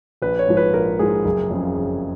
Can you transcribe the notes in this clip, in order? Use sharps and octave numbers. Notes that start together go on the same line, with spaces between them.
A#1 B4
C#5
G#2 F3
B4
A#1 A#4
G#2 F3 G#4
F#1
F2 C#3
F#1